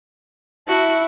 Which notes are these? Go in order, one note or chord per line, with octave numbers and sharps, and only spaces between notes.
E4 F#4 A5